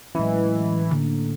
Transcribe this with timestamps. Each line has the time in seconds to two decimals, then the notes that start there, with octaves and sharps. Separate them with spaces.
0.15 A2 E3 F#3 G#3 C#4 D#5
0.91 D3 A#3